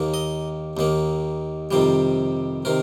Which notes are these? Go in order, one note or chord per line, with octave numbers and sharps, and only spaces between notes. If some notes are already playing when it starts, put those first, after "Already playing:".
Already playing: D#2 D#3 A#3
D#5
D#2 D#3 A#3
F2 C3 D#3 G3
C3 D#3 A#4